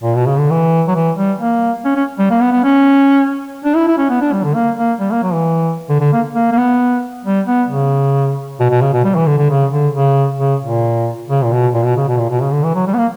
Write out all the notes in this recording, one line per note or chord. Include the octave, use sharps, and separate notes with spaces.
A#2
B2
C#3
D3
E3
F#3
E3
G3
A#3
C#4
C#4
G3
A#3
B3
B3
C#4
D4
E4
E4
C#4
B3
D4
G3
D3
A#3
A#3
G3
A#3
F#3
E3
D3
D3
A#3
A#3
A#3
B3
G3
B3
C#3
B2
B2
C#3
B2
G3
E3
D3
D3
C#3
D3
C#3
C#3
A#2
C#3
A#2
B2
A#2
B2
C#3
B2
A#2
B2
C#3
D3
E3
F#3
G3
B3
A#3